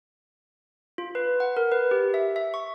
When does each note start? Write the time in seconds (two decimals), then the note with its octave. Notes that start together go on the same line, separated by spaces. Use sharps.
0.98 F4
1.15 B4
1.40 F#5
1.57 A#4
1.72 B4
1.91 G4
2.14 E5
2.36 E5
2.54 C#6